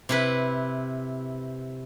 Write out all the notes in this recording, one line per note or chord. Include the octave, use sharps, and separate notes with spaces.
C3 E4 B4